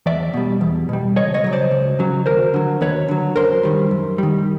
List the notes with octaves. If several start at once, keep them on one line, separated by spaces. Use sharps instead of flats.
E2 D5 E5
B2 G3
E2
B2 G3
C#2 C#5 D#5
C#5 D#5
C#3 F#3
C5 D5
C#2
C#3 F#3
D#2 A#4 C5
D3 F#3
D#2 B4 C#5
D3 F#3
F#2 A#4 C5
D#3 G3
F#2
D#3 G3